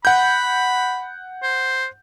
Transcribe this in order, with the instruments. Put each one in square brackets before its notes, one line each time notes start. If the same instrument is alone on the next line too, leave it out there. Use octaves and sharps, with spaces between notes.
[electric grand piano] F#5 G6 [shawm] B5
[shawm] C5